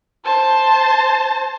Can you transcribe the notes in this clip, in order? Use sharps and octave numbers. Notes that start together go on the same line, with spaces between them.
C5 A5